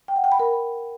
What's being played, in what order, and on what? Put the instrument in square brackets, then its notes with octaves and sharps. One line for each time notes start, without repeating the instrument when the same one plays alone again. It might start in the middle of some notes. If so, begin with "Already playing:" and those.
[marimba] G5
F#5
G5
B5
A#4